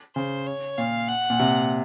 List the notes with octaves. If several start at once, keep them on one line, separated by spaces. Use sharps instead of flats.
C#3 C5
C#5
A#2 F5
F#5
A#2
C3